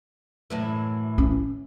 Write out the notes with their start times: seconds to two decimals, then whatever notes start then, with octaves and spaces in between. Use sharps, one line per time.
0.50 F#2 A2 E3
1.18 C#4